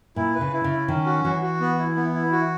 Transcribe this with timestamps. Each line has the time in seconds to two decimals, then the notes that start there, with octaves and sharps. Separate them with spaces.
0.16 A#2 E4
0.35 B4
0.41 C#3
0.53 E4
0.64 C#3
0.71 E4
0.88 D#3 C#4
1.06 F#4
1.24 E3 F#4
1.42 F#4
1.60 B3
1.78 E4
1.96 B3
2.14 E4
2.32 F#4